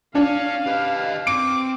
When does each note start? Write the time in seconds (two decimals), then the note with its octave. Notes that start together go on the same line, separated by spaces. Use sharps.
0.15 C#4 D4 F5
0.66 G4 B4 D#5
1.27 C4 D6 D7